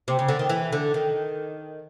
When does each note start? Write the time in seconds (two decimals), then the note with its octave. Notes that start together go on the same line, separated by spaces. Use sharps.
0.08 C3
0.19 C#3
0.29 D3
0.39 D#3
0.49 E3
0.73 D3
0.94 D#3